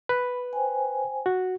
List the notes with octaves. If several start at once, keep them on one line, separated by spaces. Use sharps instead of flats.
B4 B5
C5 G5 G#5
F#4